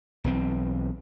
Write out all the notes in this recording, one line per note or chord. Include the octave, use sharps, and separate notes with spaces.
B1 E3 C4